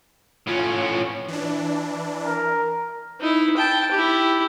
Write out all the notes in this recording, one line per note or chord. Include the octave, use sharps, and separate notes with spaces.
A2 C#4 F4
E3 D4
A#4
D#4 E4
G5 A5
E4 G4